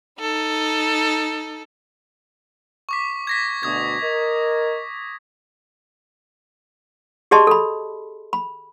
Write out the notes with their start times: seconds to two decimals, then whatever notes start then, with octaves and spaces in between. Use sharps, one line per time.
0.20 D#4 A4
2.89 C#6 D6 B6
3.27 G#6 A#6 B6
3.63 D2 B2 D#6 G#6
4.02 A#4 D#5
7.31 G4 G#4 D5 D#5 A5 C6
7.47 A4 B5
8.33 B5